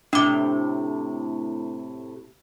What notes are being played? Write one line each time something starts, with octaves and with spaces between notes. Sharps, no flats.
A2 C3 D4 D6